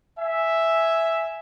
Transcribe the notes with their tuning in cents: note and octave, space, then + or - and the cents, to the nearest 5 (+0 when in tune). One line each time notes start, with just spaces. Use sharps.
E5 +0 G#5 +0